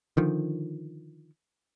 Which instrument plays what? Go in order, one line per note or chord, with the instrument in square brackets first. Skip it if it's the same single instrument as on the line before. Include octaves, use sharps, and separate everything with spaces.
[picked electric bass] D3 D#3 F3